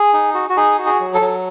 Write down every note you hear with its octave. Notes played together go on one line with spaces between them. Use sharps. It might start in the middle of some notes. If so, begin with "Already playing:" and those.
Already playing: G#4
D#4
F#4
F#4
D#4 G#4
F#4
G#4
F#3
A4
F#3